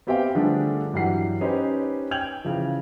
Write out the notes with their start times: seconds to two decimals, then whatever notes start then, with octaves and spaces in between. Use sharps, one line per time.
0.07 B3 C4 G4 E5 F5 G5
0.35 D3 F3 G3 A3 D4 G#4
0.93 G2 E3 F#3 G3 F#5 C7
1.41 C#4 D#4 G4 B4 C5
2.11 G5 G6 G#6 F7 F#7
2.45 C#3 E3 F3